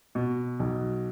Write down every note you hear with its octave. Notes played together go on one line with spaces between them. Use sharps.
B2
B1